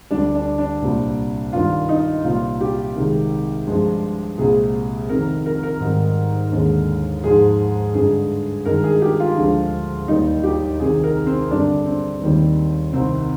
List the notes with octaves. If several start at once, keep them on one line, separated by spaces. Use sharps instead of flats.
D2 D3 G3 D4
D4
D4
C2 A#2 G3
G2 D#3 G3 F4
D#4
C2 A#2 G3 F4
G4
C2 C3 D#3 G#3
G2 F3 G#3
C2 A#2 G#3 G#4
F2 C3 D#3 A#4
A#4
A#4
G#2 D#3 G3
D#2 D3 G#3
G#2 F3 G#3 G#4
G2 D3 G#3 G#4
G2 D#3 G#3 A#4
G#4
G4
F4
D2 D3 F3 G#3
D#2 D#3 G3 D#4
G4
C2 C3 D#3 G#4
A#4
C4
G2 D3 G3 D4
C4
D#2 D#3 G3
C2 C3 D#3 C4